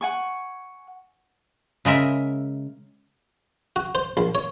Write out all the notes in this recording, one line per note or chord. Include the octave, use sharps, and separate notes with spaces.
F#5 G#5 C#6
C#3 G#3 A#4 E5
F#4
C5
A#1
C#5